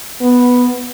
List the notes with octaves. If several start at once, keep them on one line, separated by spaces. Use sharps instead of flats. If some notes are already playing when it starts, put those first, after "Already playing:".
B3